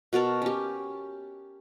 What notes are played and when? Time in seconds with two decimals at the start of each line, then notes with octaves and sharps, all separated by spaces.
0.13 B2 F#4 A#4 A5
0.42 C#4 G4